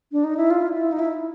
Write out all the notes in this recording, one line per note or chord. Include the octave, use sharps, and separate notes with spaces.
D4
D#4
E4
F4
E4
D#4
E4